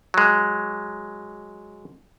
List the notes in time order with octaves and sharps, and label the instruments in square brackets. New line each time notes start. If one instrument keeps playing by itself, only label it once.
[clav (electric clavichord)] F#3 G#3